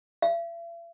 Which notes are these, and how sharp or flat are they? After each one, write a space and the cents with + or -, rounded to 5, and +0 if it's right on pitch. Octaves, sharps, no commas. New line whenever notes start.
E5 +45